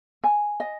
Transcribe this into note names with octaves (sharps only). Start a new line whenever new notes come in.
G#5
D#5